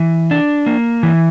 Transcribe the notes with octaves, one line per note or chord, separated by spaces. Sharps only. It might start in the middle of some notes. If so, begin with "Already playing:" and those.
Already playing: E3
D4
A#3
E3